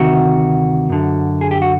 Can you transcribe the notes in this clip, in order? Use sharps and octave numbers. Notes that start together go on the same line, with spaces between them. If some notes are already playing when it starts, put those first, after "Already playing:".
Already playing: D2 C3 D#3 F#4
F#2 D3
G#4
G4
F#4